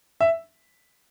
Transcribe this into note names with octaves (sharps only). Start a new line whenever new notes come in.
E5